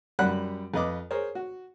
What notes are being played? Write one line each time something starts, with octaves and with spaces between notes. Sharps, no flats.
F#2 G3 F#5 B5 F#6
F2 B4 D#5 D6
G#4 A#4 C5 C#5
F#4